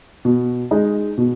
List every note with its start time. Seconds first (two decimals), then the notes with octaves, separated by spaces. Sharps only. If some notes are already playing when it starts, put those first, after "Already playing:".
0.25 B2
0.71 G#3 D#4
1.18 B2